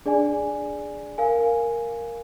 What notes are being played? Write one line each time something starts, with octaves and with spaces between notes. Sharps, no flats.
D4 G#4 D5 G#5
A#4 F5 G#5